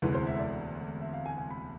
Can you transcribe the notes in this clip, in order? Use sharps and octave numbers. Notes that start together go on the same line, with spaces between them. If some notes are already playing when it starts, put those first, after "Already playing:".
E1 D2 C3 E3 G#3 B4
C5
E5
D5
E5
F5
G#5
G#5
B5